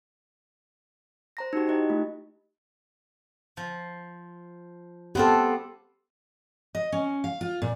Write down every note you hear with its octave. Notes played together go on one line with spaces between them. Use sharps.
C5 A#5 A#6
D#4 F#4 G4
D#4 E4 G4 D#5
A3 F4
F3
B3 C4 F4 G4 A4
D#5
C#4
F5
F4
A#2